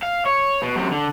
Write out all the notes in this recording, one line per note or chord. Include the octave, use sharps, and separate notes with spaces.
F5
C#5
B2
F#2 C3
D3